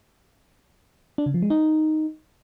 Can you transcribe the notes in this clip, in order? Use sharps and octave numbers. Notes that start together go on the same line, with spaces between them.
D4
C#3
F3
G#3
D#4